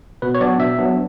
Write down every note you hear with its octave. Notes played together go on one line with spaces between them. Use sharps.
B2 B4
C#5
F#3 B3 D4 D5
B2 E5
F#3 B3 D4